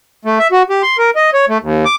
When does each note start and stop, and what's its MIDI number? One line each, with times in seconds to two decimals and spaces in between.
0.25 0.39 57
0.39 0.47 76
0.52 0.63 66
0.70 0.82 67
0.82 0.97 84
0.98 1.10 70
1.16 1.30 75
1.34 1.45 73
1.49 1.58 57
1.62 1.85 39
1.85 1.96 86